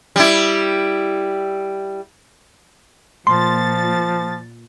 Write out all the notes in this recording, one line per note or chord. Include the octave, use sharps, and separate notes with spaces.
G3 E4
A#2 F3 C6 A6